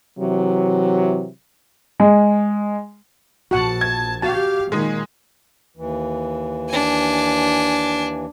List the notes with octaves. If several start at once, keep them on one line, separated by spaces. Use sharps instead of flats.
C3 E3 F#3
G#3
A#1 F#4 F#5 A5
G#6
F#4 G4 F5 A5
A#2 D#3 G#3 G#4
D#2 E3
D4 G#5